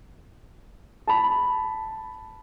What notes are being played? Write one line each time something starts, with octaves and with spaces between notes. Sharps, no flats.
A5 B5